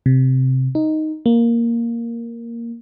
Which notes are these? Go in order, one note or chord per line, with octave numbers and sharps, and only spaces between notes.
C3
D#4
A#3